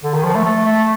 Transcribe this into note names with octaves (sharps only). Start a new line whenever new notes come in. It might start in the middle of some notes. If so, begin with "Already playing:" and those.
D3
D#3
F3
A3
A3
A3